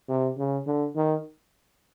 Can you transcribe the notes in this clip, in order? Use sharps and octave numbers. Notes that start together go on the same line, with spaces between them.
C3
C#3
D3
D#3